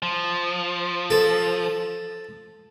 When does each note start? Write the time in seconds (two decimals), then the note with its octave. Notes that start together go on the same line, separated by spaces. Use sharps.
0.02 F3
1.10 A4